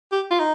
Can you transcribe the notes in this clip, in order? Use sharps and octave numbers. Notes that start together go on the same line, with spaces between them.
G4
F4
D#4